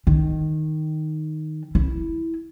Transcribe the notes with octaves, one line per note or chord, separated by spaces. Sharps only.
D#3
E4